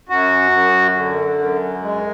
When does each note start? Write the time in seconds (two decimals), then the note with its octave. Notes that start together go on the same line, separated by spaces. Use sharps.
0.09 F#2 F#4
0.52 F#2
0.96 D3
1.38 F#2
1.82 G#3